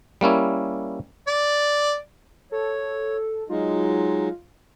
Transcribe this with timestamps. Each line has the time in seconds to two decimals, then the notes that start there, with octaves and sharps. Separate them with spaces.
0.21 G3 A#3 C#4 E4
1.28 D5
2.52 A4 C#5
3.50 F#3 G#3 D#4 F4